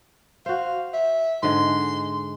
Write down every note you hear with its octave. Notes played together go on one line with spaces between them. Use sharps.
F#4 C5 F5
E5
G#2 D3 G#3 C6